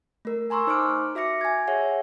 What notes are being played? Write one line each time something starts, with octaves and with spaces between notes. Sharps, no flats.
A3 A#4
G#5 A#5 C6 C#6 E6
D#4 C5 C#6 D6 F6 D7
F#4 E5 D6 A#6 C#7
G#5 G#6
G#4 C#5 E5 F#5